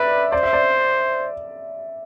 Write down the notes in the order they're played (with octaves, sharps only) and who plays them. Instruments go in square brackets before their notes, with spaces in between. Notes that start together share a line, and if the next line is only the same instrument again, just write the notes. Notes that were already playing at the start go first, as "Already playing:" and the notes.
Already playing: [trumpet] B4 [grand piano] D5 E5
[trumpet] C5 [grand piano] D5
[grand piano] E5
D5